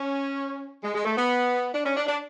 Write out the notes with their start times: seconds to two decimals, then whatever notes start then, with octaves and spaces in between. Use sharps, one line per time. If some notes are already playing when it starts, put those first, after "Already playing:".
Already playing: C#4
0.83 G#3
0.95 G#3
1.05 A3
1.17 B3
1.74 D4
1.84 C#4
1.96 D4
2.07 D4